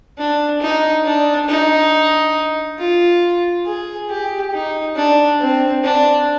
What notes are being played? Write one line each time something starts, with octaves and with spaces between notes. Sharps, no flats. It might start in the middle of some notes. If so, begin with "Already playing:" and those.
D4
D#4
D4
D#4
F4
G#4
G4
D#4
D4
C4
D4